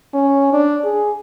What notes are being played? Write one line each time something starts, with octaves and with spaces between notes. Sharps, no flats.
C#4
D4
G#4